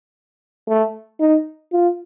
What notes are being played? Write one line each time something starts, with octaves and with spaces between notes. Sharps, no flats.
A3
D#4
F4